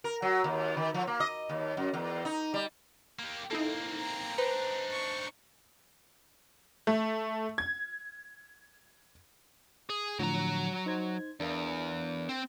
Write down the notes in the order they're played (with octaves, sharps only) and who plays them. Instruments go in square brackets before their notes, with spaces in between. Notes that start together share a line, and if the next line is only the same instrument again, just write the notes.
[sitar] A#4
F#3
D#2
D#3
F3
A#3
D#5
D#2
F#2
E2
D#4
G3
[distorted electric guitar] A#3 G4
[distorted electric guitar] A#3 C4 [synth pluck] D#4 E4 A4
[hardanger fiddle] G5 A#5
[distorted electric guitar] D4 D#4 [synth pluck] B4 [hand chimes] C5
[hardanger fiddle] C#6
[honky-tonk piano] A3
G#6
[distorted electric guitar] G#4
[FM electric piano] A2 D3 F3 [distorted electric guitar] F#3 A#5
[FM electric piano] D#4 C5 G#6
[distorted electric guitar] E2 [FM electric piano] D4 A#4 F5
[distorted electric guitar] C4